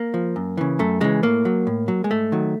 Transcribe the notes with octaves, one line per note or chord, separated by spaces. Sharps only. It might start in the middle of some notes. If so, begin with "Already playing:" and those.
Already playing: A#3
F3
F#2
C#3 E3
F#2 A3
C#3 E3 G#3
A2 A#3
F#3
A2
F#3
G#3
G#2 A3
D#3 F#3